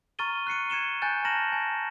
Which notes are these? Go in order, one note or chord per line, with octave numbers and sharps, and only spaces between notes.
A#5 C#6 F6 A6 D#7 G7
F#6 C7 C#7 D#7
G#6 C#7 E7 G7
G#5 A#5 F#6 G6 A6
A5 A#5 F6 A#6 E7 F#7
G#5